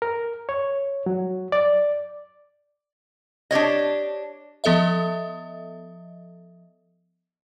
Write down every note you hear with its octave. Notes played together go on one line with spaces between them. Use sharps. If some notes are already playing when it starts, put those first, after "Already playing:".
A#4
C#5
F#3
D5
D4 G4 C#5 D#5
F3 B3 A4 D#5 E5